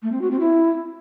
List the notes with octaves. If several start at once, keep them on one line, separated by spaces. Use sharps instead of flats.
A3
C4
F#4
C4
E4